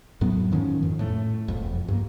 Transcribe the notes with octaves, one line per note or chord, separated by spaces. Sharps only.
F2 A2 F#3 B3
G#2 D#3 F3 C#4
F2
A2 A3
E1 F2
G2 A#3